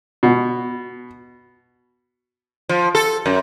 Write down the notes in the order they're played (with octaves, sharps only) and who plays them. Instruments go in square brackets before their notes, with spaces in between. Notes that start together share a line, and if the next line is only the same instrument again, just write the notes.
[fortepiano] B2
[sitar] F3
A4
F#2